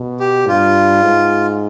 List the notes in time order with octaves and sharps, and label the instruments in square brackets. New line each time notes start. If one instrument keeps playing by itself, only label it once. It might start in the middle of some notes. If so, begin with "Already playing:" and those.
Already playing: [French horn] B2
[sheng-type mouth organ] G4
[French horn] G2 [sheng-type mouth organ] F4
[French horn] G#2